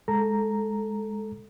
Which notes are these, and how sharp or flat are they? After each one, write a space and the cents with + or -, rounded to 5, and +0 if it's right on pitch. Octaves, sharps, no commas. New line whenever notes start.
G#3 +0 A4 +0 A#5 -5